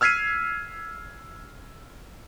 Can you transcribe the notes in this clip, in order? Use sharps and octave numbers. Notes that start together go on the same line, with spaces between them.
E6 F6 G#6 B6 C7 D#7